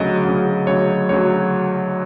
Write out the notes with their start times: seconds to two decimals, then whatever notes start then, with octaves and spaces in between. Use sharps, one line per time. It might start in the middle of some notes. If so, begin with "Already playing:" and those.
Already playing: D2 C#3 F#3 D#5
0.25 D2 C#3 F#3
0.66 D2 C#3 F#3 C#5
1.09 D2 C#3 F#3 C#5